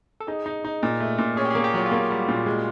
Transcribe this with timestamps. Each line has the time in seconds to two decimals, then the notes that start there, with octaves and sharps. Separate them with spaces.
0.20 A4
0.27 D#4 G#4
0.46 D#4
0.64 D#4
0.83 A#2
1.00 A3
1.18 A#2
1.37 C#4 G#4
1.45 G4
1.50 A#3 G#4
1.64 G4
1.74 F#3 F4
1.86 F4
1.91 A#3 F#4
2.10 G3
2.28 A#2
2.46 G#3